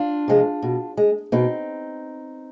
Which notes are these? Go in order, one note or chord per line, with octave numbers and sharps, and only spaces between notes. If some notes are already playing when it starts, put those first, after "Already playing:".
Already playing: D4 F4
C3 F3 G#3
B2
G#3
B2 C4 D#4